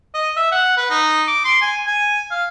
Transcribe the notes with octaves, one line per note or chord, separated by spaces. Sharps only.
D#5
E5
F#5
B4
D#4
D6
C6
G#5
G#5
F5